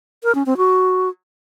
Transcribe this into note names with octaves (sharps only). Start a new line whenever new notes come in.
A#4
C#4
C4
F#4